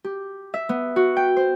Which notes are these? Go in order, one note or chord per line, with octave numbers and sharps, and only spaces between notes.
G4
E5
B3
F#4
G5
C5